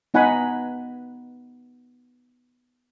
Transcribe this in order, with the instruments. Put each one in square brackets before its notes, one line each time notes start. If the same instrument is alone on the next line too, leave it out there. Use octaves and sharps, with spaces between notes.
[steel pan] B3 D#4 F#5 G#5 B5